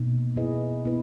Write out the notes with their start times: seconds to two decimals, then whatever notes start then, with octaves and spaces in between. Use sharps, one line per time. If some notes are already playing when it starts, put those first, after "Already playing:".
Already playing: B2 A#3 D#4
0.36 B3 E4 G#4 B4 D#5
0.85 B3 E4 B4